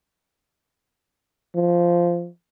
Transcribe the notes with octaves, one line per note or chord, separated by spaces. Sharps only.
F3